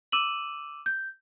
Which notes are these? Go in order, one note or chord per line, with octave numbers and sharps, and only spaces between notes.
D6 E6 D#7 E7 F#7
G6